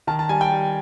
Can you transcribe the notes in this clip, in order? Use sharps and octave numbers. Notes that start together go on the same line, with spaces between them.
D#3 A5
A5
G3 G#5
G5
G3